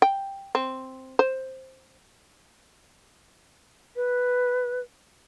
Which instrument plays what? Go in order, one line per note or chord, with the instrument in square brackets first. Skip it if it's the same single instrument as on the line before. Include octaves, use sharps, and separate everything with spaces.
[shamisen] G5
C4
C5
[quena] B4